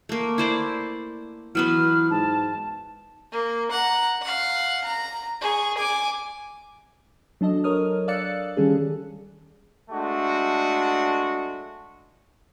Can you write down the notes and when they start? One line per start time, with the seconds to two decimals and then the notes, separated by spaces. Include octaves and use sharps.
0.09 A3 A#3
0.38 E4 C5 D5
1.55 E3 F#3 B3 B4 F6
2.11 G#2 A5
3.32 A#3
3.72 F#5 A#5
4.22 F5 F#5
4.84 A#5
5.41 G#4 C#6
5.78 G#5 D6
7.41 F#3 D4 A4 D#5
7.64 A#4 C#5 D#6 F6
8.08 D5 F5 E6 F#6 A6 C#7
8.57 D#3 G3 C#4 G#4 A4
9.90 G#3 A3 D4 F#4